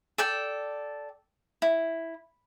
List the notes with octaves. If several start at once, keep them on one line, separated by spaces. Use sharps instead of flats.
A4 D5 G5
E4